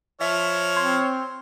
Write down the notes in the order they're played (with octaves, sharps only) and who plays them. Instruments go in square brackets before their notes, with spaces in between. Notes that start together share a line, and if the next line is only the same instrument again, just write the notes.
[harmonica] F3 F6 [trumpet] C#5 [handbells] E5
[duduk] C4 [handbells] C6 G#6